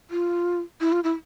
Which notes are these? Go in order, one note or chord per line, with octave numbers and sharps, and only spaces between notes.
F4
E4
F4
E4